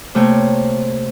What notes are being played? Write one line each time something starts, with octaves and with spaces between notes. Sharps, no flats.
C3 A3 A#3 C#5 G5